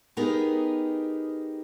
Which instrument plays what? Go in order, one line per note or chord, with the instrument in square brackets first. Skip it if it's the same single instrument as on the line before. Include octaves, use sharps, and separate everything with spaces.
[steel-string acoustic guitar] B3 D#4 G4 G#4 A#4 B4